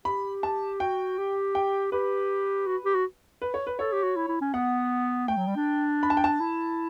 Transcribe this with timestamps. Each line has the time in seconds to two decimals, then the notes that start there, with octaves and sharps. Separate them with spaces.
0.05 G4 B5
0.43 A5
0.80 F#4 G5
1.18 G4
1.55 G5
1.92 G4 B4
2.67 F#4
2.85 G4
2.95 F#4
3.42 B4
3.54 C#5
3.67 B4
3.78 A4 C#5
3.92 G4
4.03 F#4
4.16 E4
4.28 E4
4.41 C#4
4.54 B3 F#5
5.28 A3 G5
5.37 F#3
5.47 G3
5.56 D4
6.03 B5
6.10 A5
6.17 G5
6.24 A5
6.40 E4